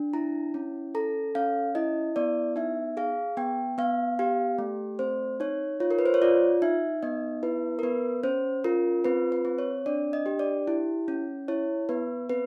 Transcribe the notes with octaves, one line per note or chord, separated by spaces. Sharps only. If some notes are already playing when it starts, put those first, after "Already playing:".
Already playing: D4
E4 A#5
C#4
A4 A#5
C#4 F5
E4 D#5
B3 D5
D#4 E5
G#4 F5
B3 G5
B3 F5
G4 F5
A3
C4 C5
D#4 C#5
F4 C#5
A#4
B4
C5
C#5
F4 D5
D#4 E5
B3 D#5
E4 B4
A#4
B3 B4
C#4 C5
F4 A#4
C4 B4
B4
C4
C#5
D4 D5
D#5
G4
D5
E4
C#4
E4 C#5
B3 B4
C4 B4